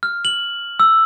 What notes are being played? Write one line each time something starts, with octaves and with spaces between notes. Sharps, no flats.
F6
F#7
E6